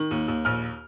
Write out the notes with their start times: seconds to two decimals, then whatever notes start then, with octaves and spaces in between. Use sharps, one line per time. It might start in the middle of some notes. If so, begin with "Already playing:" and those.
Already playing: D#3
0.11 D#2
0.28 D#2
0.45 A#1 F6